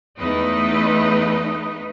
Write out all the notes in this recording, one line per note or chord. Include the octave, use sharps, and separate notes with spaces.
E2 A3 D#4 B4 D#5